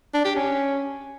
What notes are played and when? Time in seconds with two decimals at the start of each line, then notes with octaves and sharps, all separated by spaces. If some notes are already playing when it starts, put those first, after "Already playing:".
0.14 D4
0.25 G4
0.35 C#4